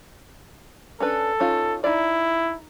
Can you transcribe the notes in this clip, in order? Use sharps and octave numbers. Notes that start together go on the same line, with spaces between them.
C#4 D4 A4 B4
C#4 D#4 F4
D#4 E4 D5